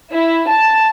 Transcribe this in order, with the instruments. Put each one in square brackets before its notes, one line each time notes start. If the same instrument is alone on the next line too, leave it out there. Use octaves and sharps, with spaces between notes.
[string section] E4
A5